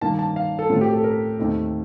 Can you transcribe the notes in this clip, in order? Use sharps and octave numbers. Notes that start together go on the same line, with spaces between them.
G2 D#3 A#3 A5
A5
F5
A4
A2 A3 C4 F4
G4
A4
A#4
D#2 D#3 A3 C4